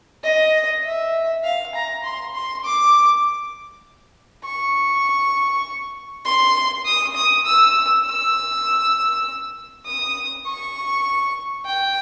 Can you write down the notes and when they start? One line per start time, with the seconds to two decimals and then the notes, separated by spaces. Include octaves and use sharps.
0.24 D#5
0.85 E5
1.44 F5
1.75 A#5
2.04 C6
2.35 C6
2.64 D6
4.44 C#6
6.25 C6
6.85 D#6
7.15 D#6
7.46 E6
8.05 E6
9.86 D#6
10.46 C#6
11.65 G5